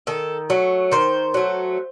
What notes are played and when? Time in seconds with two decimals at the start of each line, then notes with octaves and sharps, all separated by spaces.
0.07 D#3 A4
0.50 F#3 A3
0.91 D#3 C5
1.34 F#3 A3